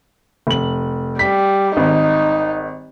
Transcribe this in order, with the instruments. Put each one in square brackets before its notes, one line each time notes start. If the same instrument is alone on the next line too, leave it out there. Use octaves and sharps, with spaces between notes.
[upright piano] F1 F#7
[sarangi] G3 [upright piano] B6
[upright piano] G#1 [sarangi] D#4